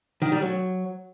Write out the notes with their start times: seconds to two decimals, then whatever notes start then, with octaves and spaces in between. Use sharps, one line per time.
0.22 D#3
0.32 G3
0.42 F#3